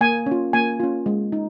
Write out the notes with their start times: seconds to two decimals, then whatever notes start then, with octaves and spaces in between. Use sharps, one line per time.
0.01 A#3 G#5
0.26 C#4
0.32 F4
0.53 A#3 G#5
0.80 C#4 F4
1.06 G#3
1.32 D#4